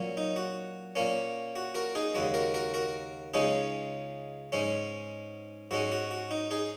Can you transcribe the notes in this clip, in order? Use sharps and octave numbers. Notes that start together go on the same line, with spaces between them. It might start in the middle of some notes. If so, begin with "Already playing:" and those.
Already playing: A#2 F#3 C#4
D#4
F#4
A#2 A#3 C#4
F#4
F#4 A#4
D#4 G#4
D#2 C#3 G#3 F#4
F#4 A#4
F#4 A#4
F#4 A#4
C#2 C#3 G#3 C#4 D#4 G#4
G#2 G#3 C#4
G#2 G#3 C#4 F#4
F#4
F#4
D#4
D#4 G#4